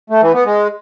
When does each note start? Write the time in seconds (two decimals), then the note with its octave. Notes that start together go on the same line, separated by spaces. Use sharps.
0.10 A3
0.22 E3
0.33 B3
0.45 G#3